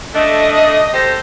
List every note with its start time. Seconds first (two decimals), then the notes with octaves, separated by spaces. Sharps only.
0.14 A3 D4 D#5
0.94 G4 A4 C5 A#6